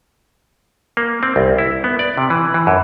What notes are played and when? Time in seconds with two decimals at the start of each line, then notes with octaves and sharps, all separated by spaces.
0.97 A#3
1.23 C4
1.36 C2
1.58 E4
1.84 B3
1.99 D5
2.17 C3
2.30 E3
2.54 E3
2.67 F#2